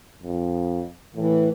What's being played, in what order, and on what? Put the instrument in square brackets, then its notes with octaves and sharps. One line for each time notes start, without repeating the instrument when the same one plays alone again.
[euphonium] F2
[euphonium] A2 [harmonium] E3